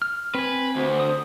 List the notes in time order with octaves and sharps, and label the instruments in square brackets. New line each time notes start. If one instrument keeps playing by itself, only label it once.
[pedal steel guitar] F6
[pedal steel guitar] C4 G#5 [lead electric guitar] B4
[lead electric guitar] D2 [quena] C5
[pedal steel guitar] D#6